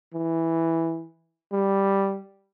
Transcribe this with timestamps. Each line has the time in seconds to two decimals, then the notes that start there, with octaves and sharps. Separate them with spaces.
0.14 E3
1.53 G3